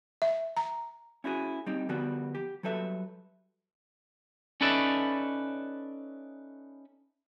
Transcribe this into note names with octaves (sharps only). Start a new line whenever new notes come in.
E5
A#5
C#4 E4 F#4 G#4
G3 C4 D#4 G4
D3 F3 G3 B3 F#4
G4
F#3 G3 A4 B4 E5
C#4 D#4 A4 B4 D5 E5